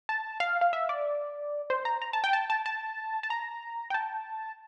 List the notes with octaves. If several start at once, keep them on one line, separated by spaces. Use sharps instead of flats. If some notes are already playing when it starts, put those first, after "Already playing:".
A5
F5
F5
E5
D5
C5
A#5
A#5
A5
G5
A5
A5
A5
A5
A#5
G5
A5